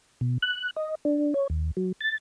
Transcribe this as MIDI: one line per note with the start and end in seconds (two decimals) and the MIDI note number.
0.21 0.38 47
0.42 0.71 90
0.76 0.95 75
1.05 1.34 62
1.34 1.47 73
1.50 1.71 39
1.77 1.92 54
2.01 2.18 93